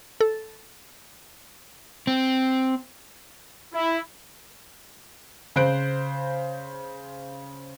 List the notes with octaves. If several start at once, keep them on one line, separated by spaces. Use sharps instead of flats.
A4
C4
E4
C#3 C5 F#6 D7